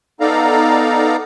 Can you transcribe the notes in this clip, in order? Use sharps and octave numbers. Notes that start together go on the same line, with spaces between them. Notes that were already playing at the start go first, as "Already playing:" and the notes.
B3 D#4 A4 D5 F5 A#5